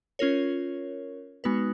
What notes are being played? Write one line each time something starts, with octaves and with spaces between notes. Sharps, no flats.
C#4 F4 A#4 C#5
G#3 B3 D#4 F#4 B4